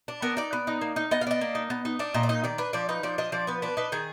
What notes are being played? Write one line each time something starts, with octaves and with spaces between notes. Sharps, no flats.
D4
B3 A#4
D#4 D5
B3
D#4
A#3
D#4
B3 D#5
F5
D4 D#5
A#3
D#4
B3
D#4
D4 D5
A#2 D#5
D5
D#4 D#5
D#3 D5
D4 B4
F3 D5
D#4 B4
F3 D5
D4 D#5
F3 D5
B3 B4
D4 B4
D#4 B4
D#3 G#4